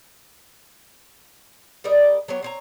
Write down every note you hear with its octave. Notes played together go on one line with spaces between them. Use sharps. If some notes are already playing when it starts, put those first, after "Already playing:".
G3 A#4 D5 D#5
F#3 B3 G4 C#5
C4 C#5 A#5